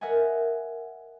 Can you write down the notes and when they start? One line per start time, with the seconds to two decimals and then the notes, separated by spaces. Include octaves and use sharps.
0.01 A#4 D#5 E5 F#5 G#5